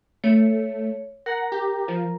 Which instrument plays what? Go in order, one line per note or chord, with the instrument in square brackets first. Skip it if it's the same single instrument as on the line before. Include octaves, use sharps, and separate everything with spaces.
[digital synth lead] A3 [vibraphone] C#5
[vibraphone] A#4 A#5 [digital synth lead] F#5
[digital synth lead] G4
F3